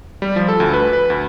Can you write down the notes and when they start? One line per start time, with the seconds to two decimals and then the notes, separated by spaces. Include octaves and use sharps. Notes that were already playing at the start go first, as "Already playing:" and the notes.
0.22 G3
0.36 F3
0.48 A4
0.60 D2
0.73 B4
0.93 B4
1.10 D2